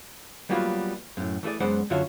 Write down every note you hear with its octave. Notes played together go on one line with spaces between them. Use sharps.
F#3 G3 A#3 B3 F4 F#4
F#2 A2
E3 A3 F4 G#4 D5
F#2 G#3 B3 C5 D5 F#5
F#2 D3 F4 F#4 C#5 E5